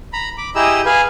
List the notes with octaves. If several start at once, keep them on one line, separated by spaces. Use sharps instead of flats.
A#5 B5
B5 D6
E4 G4 G#4 D#5 A#5 E6
G#4 B4 F5 G#5